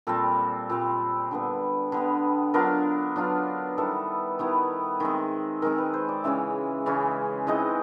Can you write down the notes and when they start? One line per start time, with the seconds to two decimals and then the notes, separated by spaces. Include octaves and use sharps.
0.07 A#2 G3 C4 A4
0.70 A#2 G3 C4
1.31 D3 G3 B3
1.92 D3 G3 B3
2.54 F#3 B3 D4 F4 A#4
3.16 F#3 B3 D4 F4
3.77 D#3 G3 B3 E4 A4
4.39 D#3 G3 B3 E4
5.00 D#3 G#3 C4
5.62 D#3 G#3 C4 A#4
5.78 B4
5.94 C5
6.09 D5
6.24 C#3 E3 G#3 C#4 E5
6.86 C#3 E3 G#3 C#4
7.47 E3 G#3 C4 D#4 D#5